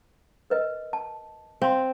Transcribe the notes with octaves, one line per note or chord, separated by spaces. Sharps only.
A#4 B4 D#5
A5
C4 F5 C6